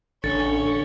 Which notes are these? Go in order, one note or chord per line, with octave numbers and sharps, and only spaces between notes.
A1 D3 C#4 C#6 A6